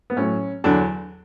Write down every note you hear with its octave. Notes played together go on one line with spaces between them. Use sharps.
B3
A2 F#3 C#4
E2 D3 F#3 D4